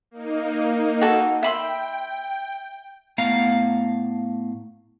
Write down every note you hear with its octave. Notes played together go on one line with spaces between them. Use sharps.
A#3 D#4
F#4 A4
E5 G5 B5 C6
A2 A3 B3 F5 F#5 A#5